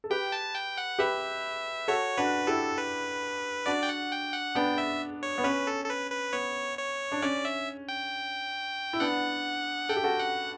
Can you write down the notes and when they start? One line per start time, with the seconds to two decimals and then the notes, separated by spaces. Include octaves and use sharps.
0.04 A4
0.10 G4 B4 G5
0.32 A5
0.55 G5
0.78 F#5
0.99 G4 B4 E5
1.88 F#4 A4 C#5
2.17 D4 F#4 B4
2.47 E4 G4 A4
2.78 B4
3.66 D4 F#4 D5
3.83 G5
3.89 F#5
4.11 G5
4.33 F#5
4.55 B3 D4 G5
4.78 E5
5.23 C#5
5.38 B3
5.44 C#4 B4
5.67 A4
5.85 A4
5.89 B4
6.11 B4
6.33 B3 C#5
6.78 C#5
7.12 D4
7.22 C#4 D5
7.45 E5
7.89 G5
8.93 E4
9.00 B3 D4 F#5
9.89 A4 G5
9.96 G4
10.04 F#4 A4
10.19 F#5